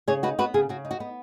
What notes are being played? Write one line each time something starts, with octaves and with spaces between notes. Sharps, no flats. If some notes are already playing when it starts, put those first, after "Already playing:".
C#3 G#4 C#5
D#4 F#4 B4
B3 F#4 B4
C#3 G#4
C#3 F#4
D#4
F#4
B3